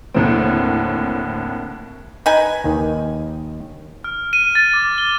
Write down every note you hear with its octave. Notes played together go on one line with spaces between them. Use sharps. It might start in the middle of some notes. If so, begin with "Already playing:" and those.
D#2 A2 D3 F#3 A#3 C4
D#4 B4 G#5
D#2 D#3
F6
D#7
A6
D6
G7